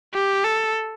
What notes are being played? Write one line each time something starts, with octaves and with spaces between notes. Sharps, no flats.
G4
A4